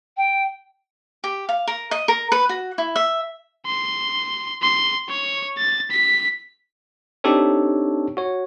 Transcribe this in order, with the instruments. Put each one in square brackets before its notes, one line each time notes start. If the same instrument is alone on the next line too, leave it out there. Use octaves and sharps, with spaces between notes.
[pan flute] G5
[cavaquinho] G4
F5
A#4
D#5
A#4
B4
F#4
E4
E5
[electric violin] C6
C6
C#5
A6
B6
[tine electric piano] C4 D4 D#4 G4 A4 C#5
F#4 C#5